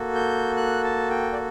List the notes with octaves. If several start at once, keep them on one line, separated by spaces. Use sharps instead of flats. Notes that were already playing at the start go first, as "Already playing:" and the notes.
Already playing: A#3 F#4 A4
G6
F#6
A5
G5
D5